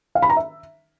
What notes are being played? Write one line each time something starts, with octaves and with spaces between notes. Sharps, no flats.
F5
B5
A#5
E5